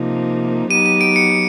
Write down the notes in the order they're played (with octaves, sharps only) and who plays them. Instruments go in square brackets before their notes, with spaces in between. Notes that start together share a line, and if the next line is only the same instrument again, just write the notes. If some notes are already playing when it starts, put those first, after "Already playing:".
Already playing: [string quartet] C3 F3 A#3 D#4
[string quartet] F#3 B3 D#4 G4 [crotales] D#7
[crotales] D#7
D7
C#7